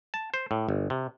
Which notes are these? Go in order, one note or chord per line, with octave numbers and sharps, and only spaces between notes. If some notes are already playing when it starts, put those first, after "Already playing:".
A5
C5
A2
G1
C3